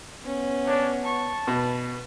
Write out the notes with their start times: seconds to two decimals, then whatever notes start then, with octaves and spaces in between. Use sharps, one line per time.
0.25 B3 C#4
0.67 D4 C#5
1.05 A5 C#6
1.47 B2 B4